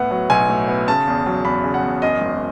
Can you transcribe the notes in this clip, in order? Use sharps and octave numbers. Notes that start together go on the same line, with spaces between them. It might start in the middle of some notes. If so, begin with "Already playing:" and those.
Already playing: A2 B3 F#5
F#3
B1 G#5
A2
B3
C#3 A5
E2
F#3
E2 B5
C#3
F#5
E2
F#2 D#5
G#1